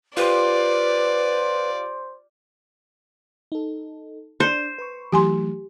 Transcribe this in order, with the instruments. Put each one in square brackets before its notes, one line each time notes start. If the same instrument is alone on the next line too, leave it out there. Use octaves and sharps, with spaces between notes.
[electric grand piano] F4 G4 C6 [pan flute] B4 [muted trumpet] C5 [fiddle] D5
[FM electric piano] D#4 A4
[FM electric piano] D4 D5 [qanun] C5
[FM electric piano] B4 B5 C#6
[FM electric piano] E3 F#3 A3 [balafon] G4 G#5 C6